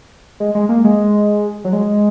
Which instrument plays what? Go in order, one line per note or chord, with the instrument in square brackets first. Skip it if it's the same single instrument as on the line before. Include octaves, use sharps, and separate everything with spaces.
[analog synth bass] G#3
G#3
A#3
G#3
F#3
G#3